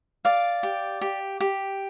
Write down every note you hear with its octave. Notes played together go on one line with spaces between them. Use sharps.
D5 F5
G4
G4
G4